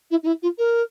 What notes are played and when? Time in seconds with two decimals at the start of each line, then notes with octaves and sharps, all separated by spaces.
0.10 E4
0.23 D#4
0.26 E4
0.42 F4
0.58 A#4